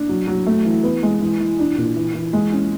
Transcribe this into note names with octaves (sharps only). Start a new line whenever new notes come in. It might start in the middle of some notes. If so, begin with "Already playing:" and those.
Already playing: D4
F#3
F#3
A3
E3
B3
G#3
E3
E3
D4
A#2
E3
E3
G#3
C#4